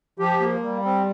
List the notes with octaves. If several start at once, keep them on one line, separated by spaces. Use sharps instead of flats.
F3 G4
A#3
G3
C4